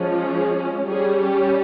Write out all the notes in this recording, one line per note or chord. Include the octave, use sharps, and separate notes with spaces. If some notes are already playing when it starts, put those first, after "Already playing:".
Already playing: F3 G#3 C#4
G#4
G3 C#4 G#4
G4